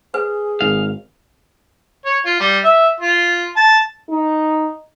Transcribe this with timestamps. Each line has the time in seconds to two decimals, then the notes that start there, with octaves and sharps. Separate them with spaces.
0.14 G#4 B4
0.61 G#1 F5
2.05 C#5
2.26 F4
2.40 G3
2.64 E5
3.00 F4
3.57 A5
4.10 D#4